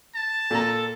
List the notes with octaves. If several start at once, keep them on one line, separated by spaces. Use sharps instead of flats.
A5
A#2 A4 A#5